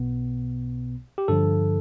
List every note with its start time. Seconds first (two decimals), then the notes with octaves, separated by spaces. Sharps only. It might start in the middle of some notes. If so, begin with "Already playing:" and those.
Already playing: B1 B2 B3
1.18 G4
1.28 G2 D3 F3 A4